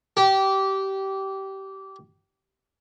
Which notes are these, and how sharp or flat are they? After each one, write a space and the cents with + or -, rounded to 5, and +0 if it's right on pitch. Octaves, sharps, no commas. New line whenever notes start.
G4 -20